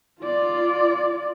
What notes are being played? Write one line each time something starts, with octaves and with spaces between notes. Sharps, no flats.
F4 D5